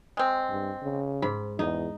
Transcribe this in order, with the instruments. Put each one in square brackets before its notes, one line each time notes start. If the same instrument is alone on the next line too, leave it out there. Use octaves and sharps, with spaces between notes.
[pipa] G#3 C4
[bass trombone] G2
C#3
[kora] G#2 [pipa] B5
[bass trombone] E2 [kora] D#4